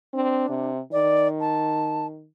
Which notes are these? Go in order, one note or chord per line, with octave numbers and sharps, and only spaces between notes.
C4 D4
C3
D#3 D5
A5